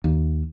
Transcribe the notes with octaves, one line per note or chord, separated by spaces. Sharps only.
D#2